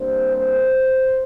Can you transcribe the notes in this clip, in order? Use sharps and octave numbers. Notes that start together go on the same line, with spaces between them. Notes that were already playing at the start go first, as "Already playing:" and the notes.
Already playing: C3 G3 A#3 D4 C5
C5